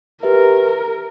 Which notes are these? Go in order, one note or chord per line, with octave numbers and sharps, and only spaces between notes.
G4 A#4 B4 E5